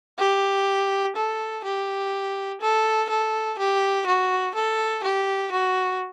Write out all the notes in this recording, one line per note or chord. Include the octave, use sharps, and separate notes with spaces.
G4
A4
G4
A4
A4
G4
F#4
A4
G4
F#4